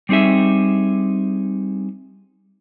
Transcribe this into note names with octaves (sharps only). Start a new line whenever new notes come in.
G3 C4 D#4 G#4 E5